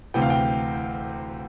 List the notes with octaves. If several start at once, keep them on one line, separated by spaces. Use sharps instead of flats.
D2 C3 E3 G5
F5
G5